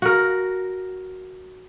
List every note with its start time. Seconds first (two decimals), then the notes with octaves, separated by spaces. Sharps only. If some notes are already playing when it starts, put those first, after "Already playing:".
0.02 F#4 A#4